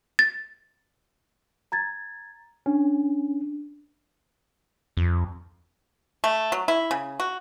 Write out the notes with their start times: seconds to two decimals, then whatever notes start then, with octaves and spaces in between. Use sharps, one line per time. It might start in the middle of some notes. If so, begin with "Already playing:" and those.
0.19 A6
1.72 A#5 G#6 A6
2.66 C#4 D4
4.97 F2
6.24 A3
6.52 F#3
6.68 E4
6.91 C#3
7.20 F#4